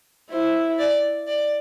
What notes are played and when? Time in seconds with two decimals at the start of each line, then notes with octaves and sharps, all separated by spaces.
0.31 E4 C5
0.79 D5
1.27 D5